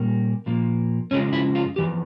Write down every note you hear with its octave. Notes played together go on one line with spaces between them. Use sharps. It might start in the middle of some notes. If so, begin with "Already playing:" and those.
Already playing: A#2 G3 A#3
A#2 F3 A#3
F2 C#3 F3 G#3 C#4
E4
F4
F2 E3 G4